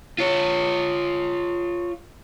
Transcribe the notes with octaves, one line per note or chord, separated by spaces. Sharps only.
F4 C#5